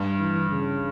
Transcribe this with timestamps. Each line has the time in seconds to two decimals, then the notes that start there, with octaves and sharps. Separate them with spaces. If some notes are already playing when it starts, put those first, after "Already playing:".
Already playing: G2
0.19 E3
0.50 C#3